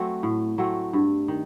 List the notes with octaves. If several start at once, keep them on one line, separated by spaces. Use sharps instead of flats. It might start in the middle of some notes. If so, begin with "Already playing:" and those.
Already playing: F#3 A3 C4
A2
F#3 A3 C4
G2
D#3